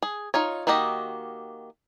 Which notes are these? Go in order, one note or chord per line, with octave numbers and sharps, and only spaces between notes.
G#4
D#4 F4 C#5
D#3 A#3 F#4 G4 D#5